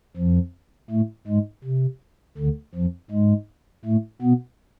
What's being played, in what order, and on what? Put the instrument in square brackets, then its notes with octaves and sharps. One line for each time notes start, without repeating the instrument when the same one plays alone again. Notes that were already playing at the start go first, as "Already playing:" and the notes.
[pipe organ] F2 F3
A2 A3
G#2 G#3
C3
D2 D3
F2 F3
G#2 G#3
A2 A3
B2 B3